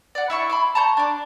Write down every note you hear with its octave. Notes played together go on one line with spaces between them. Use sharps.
D5 F#5
E4 E5 C#6
B5 C6 D6
A5 A#5 C#6 G6
D4 D6